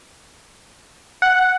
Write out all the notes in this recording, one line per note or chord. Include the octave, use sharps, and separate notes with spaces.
F#5